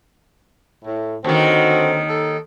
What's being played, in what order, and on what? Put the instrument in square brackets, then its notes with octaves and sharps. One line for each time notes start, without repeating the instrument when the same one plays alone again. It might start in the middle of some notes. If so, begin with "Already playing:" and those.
[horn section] A2
[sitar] D#2 D#3 [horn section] D3 C4 F#4
[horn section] A4